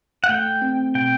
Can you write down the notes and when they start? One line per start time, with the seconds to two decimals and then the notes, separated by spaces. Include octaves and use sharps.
0.24 F#5
0.29 A3 G5
0.62 C4
0.95 B2 G5